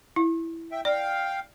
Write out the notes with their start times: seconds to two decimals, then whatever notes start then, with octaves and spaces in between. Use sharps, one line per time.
0.16 E4
0.72 E5 G5
0.85 D5 F5 G5